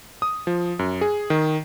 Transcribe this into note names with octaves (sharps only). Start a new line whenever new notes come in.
D#6
F3
F#2
G#4
D#3